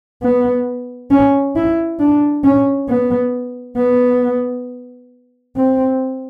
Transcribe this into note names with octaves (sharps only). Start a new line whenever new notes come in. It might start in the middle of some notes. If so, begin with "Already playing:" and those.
B3
C#4
E4
D4
C#4
B3
B3
C4